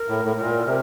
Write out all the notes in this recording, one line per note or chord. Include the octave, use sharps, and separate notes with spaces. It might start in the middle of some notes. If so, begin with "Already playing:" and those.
Already playing: A#4
A2
A2
A2
A#2
C3